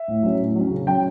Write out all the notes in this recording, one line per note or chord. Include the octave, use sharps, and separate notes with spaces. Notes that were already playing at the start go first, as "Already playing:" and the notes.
Already playing: E5
A2
F#3 C#4
A2
F#3 C#4
C#3
F#3 C#4 G5